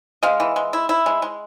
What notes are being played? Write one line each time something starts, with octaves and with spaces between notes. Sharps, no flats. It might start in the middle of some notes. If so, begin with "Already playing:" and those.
G#3 D#5 F5
E3
G#3
E4
E4
G#3
G#3